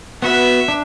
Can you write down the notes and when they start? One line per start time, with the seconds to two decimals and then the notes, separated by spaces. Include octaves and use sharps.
0.22 B3 F#4 B4 E5
0.68 D4